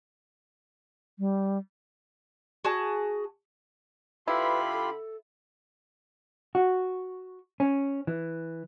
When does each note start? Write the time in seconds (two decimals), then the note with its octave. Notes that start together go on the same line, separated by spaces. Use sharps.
1.19 G3
2.65 F#4 G#4 A5
4.28 D3 E4 F4 G4 B4 B5 C6
4.73 A4
6.55 F#4
7.60 C#4
8.07 E3